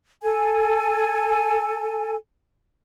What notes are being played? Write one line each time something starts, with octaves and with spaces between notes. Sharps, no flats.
A4 G#5